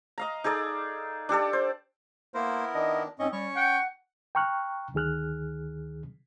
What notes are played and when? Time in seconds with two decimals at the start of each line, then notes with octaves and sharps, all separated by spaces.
0.18 D#5 F5 A#5
0.44 D#4 G#4 A4 D5
1.29 D4 G4 A4 D5
1.53 C5
2.34 A#3 B3 E4 A#4 C5
2.75 D#3 D4 D#5
3.19 G#2 C4 C#4 D#5 C#6
3.32 G3 C#4 C#5 C#6
3.56 F#5 G5
4.35 G5 A#5 C#6 F6 F#6
4.94 D2 D#3 G#4 F6 F#6